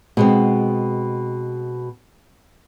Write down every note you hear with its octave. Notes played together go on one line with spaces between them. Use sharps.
B2 G#3 C4